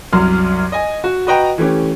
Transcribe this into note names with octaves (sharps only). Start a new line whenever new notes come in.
C2 F#2 F#3 C6 F6
D#5 G#5
F#4
F#4 B4 D#5 F#5 G5 A#5
E3 A3 C#4 G4